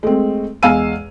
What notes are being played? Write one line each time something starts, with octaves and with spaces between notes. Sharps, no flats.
G#3 A3 C4
E2 G#3 F5 G#5 E6 D#7